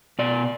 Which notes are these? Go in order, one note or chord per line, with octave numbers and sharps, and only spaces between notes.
B2 D5